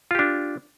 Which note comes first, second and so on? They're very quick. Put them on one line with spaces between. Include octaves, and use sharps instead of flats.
F4 G4 D4